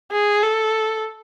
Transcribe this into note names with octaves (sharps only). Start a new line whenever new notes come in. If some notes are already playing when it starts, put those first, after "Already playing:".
G#4
A4